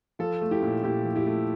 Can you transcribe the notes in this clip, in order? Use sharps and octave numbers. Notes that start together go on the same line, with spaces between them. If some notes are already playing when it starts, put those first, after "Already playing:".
F3 F4 A4
A3
E4 G4
A#2
A#2 E4 G4
F3
E4 G4
A3